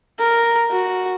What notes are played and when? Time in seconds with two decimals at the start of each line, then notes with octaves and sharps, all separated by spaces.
0.19 A#4
0.71 F#4